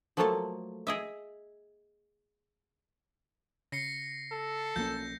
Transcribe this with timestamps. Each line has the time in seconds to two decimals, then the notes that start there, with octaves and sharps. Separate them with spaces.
0.17 F3 F#3 A3 A#3 A4 A5
0.87 G#4 D#5 E5
3.72 C#3 A#6 C7 C#7
4.32 A4
4.76 B1 F3 A#3 C#4 G6 A#6